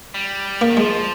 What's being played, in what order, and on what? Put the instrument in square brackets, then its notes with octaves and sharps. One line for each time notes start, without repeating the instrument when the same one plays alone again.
[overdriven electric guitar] G3
[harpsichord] A#3
[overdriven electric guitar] D#3
[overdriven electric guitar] F3 [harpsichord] G#3